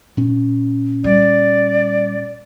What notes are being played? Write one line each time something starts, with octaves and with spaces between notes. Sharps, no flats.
A#2 C#4
G3 D5